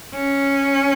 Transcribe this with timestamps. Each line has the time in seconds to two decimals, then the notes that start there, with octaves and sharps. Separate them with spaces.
0.14 C#4